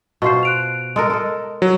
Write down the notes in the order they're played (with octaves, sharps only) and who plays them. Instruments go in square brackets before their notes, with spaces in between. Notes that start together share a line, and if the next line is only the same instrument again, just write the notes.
[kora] B2 F4 C5 [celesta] C#6 C7
[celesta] F#6 D7 F7
[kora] G#3 A4 A#4
[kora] G#3 A4 [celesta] A#4
[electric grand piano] F#3